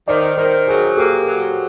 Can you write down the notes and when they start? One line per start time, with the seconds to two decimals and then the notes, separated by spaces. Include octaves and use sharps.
0.08 D#3 C5 D5
0.37 D#3 A#4 C5
0.68 F#3 G#4 A#4
0.97 A#3 G4 A4
1.27 F#3